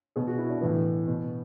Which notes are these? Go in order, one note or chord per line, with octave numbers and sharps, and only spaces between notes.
B2 G#4
F#4
E4
D4
A2 E3 B3
B2